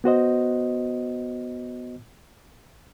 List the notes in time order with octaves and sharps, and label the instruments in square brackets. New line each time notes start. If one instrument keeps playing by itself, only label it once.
[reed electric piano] B3 F#4 C5 D#5